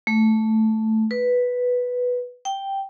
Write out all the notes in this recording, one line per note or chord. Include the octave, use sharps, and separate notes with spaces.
A3
B4
G5